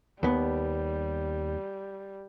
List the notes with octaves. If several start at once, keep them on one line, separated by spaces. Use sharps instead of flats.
D#2 G3 B3